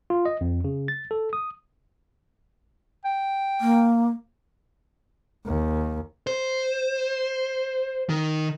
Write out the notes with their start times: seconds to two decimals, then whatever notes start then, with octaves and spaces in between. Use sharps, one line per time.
0.10 F4
0.26 D#5
0.41 F2
0.64 C#3
0.88 A6
1.11 A4
1.33 D#6
3.05 G5
3.61 A#3
5.46 D#2
6.27 C5
8.09 D#3